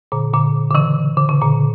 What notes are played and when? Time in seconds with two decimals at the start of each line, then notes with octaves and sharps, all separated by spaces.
0.12 A#2 D3
0.34 A#2 D3
0.71 D3
0.75 C#3 E3
1.17 D3
1.29 C#3
1.41 A#2 D3